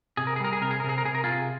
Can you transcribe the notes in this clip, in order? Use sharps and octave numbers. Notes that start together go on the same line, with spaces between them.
C3 G#4
A#4
G#4
G3 A#4
G#4
C3 A#4
G#4
A#4
C3
G#4
A#4
C3 G#4
A#4
C3 F4 G#4